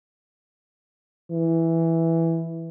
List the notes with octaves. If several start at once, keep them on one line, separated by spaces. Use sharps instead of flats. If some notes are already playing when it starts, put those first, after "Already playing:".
E3